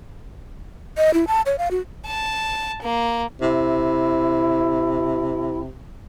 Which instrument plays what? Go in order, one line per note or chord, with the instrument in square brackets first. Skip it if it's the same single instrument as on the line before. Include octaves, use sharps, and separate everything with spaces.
[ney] D#5
E4
A5
C#5
F5
F#4
[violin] A5
A#3
[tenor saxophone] C3 [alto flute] E4